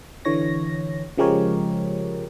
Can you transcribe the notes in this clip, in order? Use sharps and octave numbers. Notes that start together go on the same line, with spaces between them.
D3 E3 C#5 A#6
C#3 F3 G#3 G4 A#4 C#5